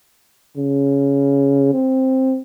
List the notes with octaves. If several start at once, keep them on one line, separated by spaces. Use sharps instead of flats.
C#3
C4